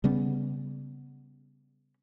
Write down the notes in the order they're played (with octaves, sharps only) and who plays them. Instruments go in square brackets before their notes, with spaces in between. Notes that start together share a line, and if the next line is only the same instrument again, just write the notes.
[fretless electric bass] C#3 G3 B3 C#4